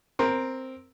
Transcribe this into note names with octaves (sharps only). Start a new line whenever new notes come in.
C4 A#4